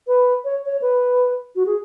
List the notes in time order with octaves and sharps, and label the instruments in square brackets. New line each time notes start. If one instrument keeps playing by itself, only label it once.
[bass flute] B4
C#5
C#5
B4
F#4
G#4